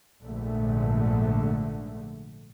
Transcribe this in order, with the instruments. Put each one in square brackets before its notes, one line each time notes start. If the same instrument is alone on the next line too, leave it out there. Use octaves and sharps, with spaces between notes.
[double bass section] A#1 G#2 D3 A3